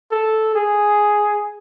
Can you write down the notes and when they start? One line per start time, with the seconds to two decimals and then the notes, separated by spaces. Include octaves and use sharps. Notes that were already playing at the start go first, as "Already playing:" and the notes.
0.12 A4
0.55 G#4